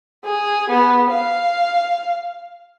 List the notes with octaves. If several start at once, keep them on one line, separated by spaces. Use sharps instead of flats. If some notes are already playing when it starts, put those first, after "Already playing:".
G#4
B3
F5